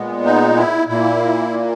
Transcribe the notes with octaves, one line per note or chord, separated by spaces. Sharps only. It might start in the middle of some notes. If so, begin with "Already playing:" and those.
Already playing: A#2 G#3 B3
D#4
E4
A#2 A#3 E4